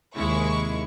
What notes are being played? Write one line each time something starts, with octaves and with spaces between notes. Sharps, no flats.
D#2 C3 G#3 E4 C#6